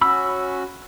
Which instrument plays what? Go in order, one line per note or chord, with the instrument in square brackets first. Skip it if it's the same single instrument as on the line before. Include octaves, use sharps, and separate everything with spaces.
[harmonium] C#4 F#4 [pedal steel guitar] B5 E6